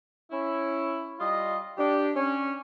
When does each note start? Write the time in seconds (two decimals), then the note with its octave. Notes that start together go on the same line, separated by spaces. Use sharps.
0.31 C#4 E4
1.19 G3 F4 D#5
1.78 D4 G4
2.16 C#4